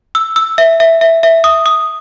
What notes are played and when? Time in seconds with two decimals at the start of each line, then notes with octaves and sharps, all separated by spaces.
0.15 E6
0.36 E6
0.58 E5
0.80 E5
1.01 E5
1.23 E5
1.44 D#6
1.66 D#6